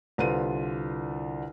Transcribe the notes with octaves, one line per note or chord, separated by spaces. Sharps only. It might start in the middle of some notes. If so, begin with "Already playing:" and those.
C2 D3 F4 B4 C5 D#7